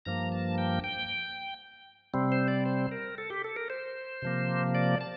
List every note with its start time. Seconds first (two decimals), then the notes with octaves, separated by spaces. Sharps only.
0.06 G2 F3 A#3 A#5
0.32 A5
0.58 G5
0.84 G5
2.14 C3 G3 C4
2.32 C5
2.48 D5
2.66 C5
2.91 A#4
3.18 A4
3.30 G4
3.44 A4
3.56 A#4
3.70 C5
4.22 C3 F3 A#3
4.75 D5
5.01 A5